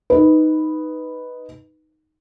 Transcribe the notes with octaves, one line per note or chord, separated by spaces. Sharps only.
D#4 B4